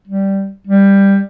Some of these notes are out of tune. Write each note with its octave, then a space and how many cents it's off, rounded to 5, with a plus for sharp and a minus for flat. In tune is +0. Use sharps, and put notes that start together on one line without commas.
G3 -5
G3 +10